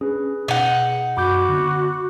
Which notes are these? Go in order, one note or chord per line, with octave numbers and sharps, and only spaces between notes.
C#4 D4 G#4 B4
B2 D#4 F#5
F#2 F#4 B5 D6 G6
D3 B3